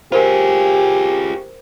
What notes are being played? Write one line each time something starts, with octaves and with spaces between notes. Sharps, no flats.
F4 G4 G#4 A#4 C5